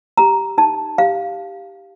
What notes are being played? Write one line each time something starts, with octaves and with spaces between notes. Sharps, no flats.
G4 A#5
D#4 A5
G4 F5